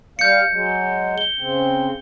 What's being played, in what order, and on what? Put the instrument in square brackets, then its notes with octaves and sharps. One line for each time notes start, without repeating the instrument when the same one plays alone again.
[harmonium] G3 F5 [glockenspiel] G6 C#7
[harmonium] F#3 G#3
[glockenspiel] G7
[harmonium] C#3 C4